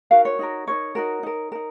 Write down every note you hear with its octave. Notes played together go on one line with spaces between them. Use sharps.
D#4 F#4 A#4 F5
C#5
D#4 F#4 A#4
D#4 F#4 A#4 C#5
D#4 F#4 A#4
D#4 A#4
D#4 A#4